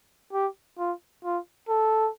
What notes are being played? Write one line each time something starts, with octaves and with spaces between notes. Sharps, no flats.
G4
F4
F4
A4